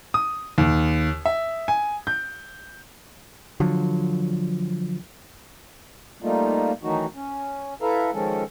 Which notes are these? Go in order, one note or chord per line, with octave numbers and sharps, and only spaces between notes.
D#6
D#2
E5
G#5
G6
D3 F3 F#3
G3 A3 A#3 D#4 F4
D#3 E3 F#3 A3 D#4 F#4
C#4
E4 A4 B4 E5 F5 A#5
D#3 F3 G#3 C#4 A4